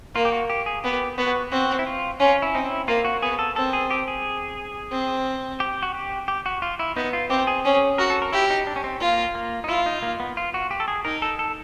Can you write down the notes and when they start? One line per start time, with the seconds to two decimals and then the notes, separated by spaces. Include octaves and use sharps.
0.15 A#3 F4
0.25 G4
0.32 F#4
0.50 G4
0.66 G#4
0.84 B3 G4
1.18 B3 F#4
1.52 C4 F#4
1.79 E4
1.86 F4
2.20 C#4 F4
2.42 E4
2.54 C4 D#4
2.65 E4
2.88 A#3 F4
3.05 F#4
3.22 B3 G#4
3.39 A4
3.56 C4 A4
3.73 G#4
3.91 G4
4.08 G#4
4.92 C4
5.60 G4
5.83 F#4
5.94 G4
6.28 G4
6.46 F#4
6.62 F4
6.79 E4
6.96 B3 D#4
7.13 F4
7.30 C4 G4
7.47 G#4
7.65 C#4 G#4
7.98 F#4 A#4
8.10 A4
8.22 A#4
8.32 E4 G4
8.50 D#4
8.67 D4
8.76 C#4
8.84 C4
9.00 A#3 F4
9.35 A#3
9.64 D#4
9.69 E4 F4
9.86 D#4
10.02 A#3
10.20 B3
10.37 F4
10.54 F#4
10.71 G4
10.80 A4
10.88 G#4
11.05 D#4 A#4
11.22 A4
11.39 A4